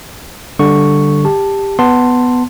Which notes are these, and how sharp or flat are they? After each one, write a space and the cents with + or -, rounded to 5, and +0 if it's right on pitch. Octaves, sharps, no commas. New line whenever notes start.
D3 +0 G3 +0 C#6 +0
G4 +15 A5 +0
B3 +5 A5 +10 C6 +0